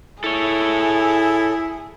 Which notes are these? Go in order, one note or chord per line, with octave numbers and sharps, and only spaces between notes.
E4 G#4 A4 C#5